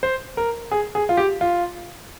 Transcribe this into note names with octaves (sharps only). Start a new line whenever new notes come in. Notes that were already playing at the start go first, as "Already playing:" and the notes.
C5
A#4
G#4
G#4
F4
G4
F4